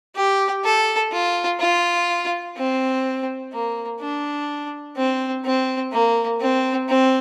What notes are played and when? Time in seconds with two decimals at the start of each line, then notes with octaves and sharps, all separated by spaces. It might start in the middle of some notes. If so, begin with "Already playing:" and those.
0.16 G4
0.64 A4
1.12 F4
1.60 F4
2.57 C4
3.53 A#3
4.00 D4
4.96 C4
5.45 C4
5.92 A#3
6.40 C4
6.89 C4